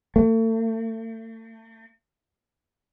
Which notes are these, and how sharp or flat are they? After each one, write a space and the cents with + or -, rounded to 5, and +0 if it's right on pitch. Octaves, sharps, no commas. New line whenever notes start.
A3 +40